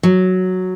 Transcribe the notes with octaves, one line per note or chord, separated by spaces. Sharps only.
F#3